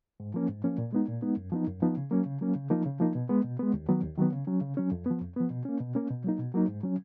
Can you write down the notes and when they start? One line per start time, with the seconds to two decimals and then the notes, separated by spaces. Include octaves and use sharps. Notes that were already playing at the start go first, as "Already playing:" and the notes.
0.20 G#2
0.34 F3 A#3 C#4
0.49 G#2
0.64 F3 A#3 C#4
0.78 A#2
0.93 G#3 B3 D#4
1.08 A#2
1.22 G#3 B3 D#4
1.37 F#2
1.52 F3 B3 D#4
1.67 F#2
1.82 F3 B3 D#4
1.97 C#3
2.11 F#3 A#3 C#4
2.26 C#3
2.41 F#3 A#3 C#4
2.56 C#3
2.70 F3 A#3 D#4
2.86 C#3
3.00 F3 A#3 D#4
3.15 B2
3.30 G#3 B3
3.44 B2
3.59 G#3 B3
3.74 D#2
3.88 D#3 F#3 B3
4.03 D#2
4.18 D#3 F#3 B3
4.32 C#3
4.47 F#3 C#4
4.61 C#3
4.77 F#3 C#4
4.91 F2
5.06 F3 B3
5.21 F2
5.36 F3 B3
5.50 B2
5.65 A#3 C#4
5.81 B2
5.95 A#3 C#4
6.10 B2
6.24 F#3 A#3 D#4
6.39 B2
6.54 F#3 A#3 D#4
6.68 G#2
6.83 F#3 C#4